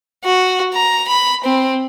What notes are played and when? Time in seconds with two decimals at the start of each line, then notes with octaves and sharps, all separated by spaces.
0.24 F#4
0.74 A#5
1.08 B5
1.44 C4